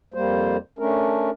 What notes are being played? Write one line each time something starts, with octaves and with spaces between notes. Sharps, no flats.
F2 G3 A#3 C5
A3 C#4 D4 A#4